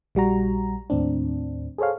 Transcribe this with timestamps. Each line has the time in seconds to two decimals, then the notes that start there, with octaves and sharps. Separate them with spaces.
0.15 A#1 G3 F#4 A#5
0.90 D#2 A2 C4 D4
1.78 G#4 A4 C5 C#5 F5